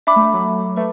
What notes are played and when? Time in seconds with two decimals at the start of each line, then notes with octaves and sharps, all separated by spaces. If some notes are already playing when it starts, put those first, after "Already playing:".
0.07 D4 E5 B5 D6
0.16 A3
0.34 F#3
0.76 A3 B4 E5